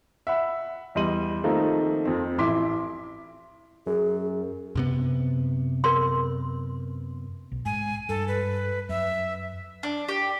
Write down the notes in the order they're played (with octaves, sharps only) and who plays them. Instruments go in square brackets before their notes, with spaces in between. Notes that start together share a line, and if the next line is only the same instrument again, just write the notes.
[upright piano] E5 F#5 B5
E2 G3 D#5 C6 D#7 F#7
D#3 F3 A3 A#3 C4 D#4
F2 C4
A1 E4 C6 D6 B6
[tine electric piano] F#2 [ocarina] G#4
[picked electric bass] F#2 C3 B3
[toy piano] A#4 B4 C6
[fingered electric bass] B1
[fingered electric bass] G#2 [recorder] G#5
[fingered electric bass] G2 [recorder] A4
[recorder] B4
[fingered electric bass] F#2 [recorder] E5
[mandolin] D4
G4